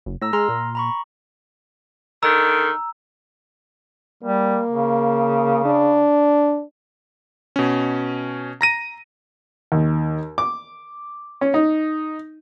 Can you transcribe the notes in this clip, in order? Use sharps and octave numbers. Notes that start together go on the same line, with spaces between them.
F#1
A2 A#5 E6 A#6
G#3 A#5 C6 F6
A#2
A#5 B5 C#6
D3 D#3 A#5 E6
G3 A#3
C#3
D4
B2 C#4
A#5 A#6 D#7
D#2
D6
C#4
D#4